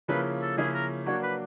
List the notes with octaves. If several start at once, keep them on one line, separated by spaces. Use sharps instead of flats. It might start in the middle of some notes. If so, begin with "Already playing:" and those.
C#3 F3 A#3 C#4 E4 B4
A4
C#3 F3 A#3 C#4 E4 G#4
A#4
F#3 A#3 D4 F#4 C#5
B4